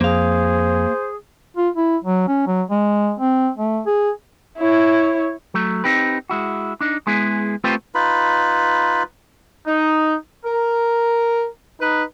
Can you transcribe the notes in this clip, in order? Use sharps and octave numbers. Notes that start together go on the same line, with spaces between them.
F2 A#3 G#4 C5 F5
F4
E4
F#3
C#4
F#3
G#3
C4
A3
G#4
E4 C#5
F#3 A3
C4 D#4 G4 B4
G#3 E4 F#4
D4 D#4
G#3 B3 E4 G#4
A3 C4 F4 G4 B4 C5
D#4 F4 B4 B5
D#4
A#4
D#4 B4